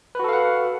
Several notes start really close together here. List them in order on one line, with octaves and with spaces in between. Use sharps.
B4 F#4 A4 F5 F#5